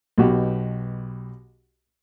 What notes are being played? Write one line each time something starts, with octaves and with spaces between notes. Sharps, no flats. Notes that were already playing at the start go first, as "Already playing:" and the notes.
B1 B2 F#4 G4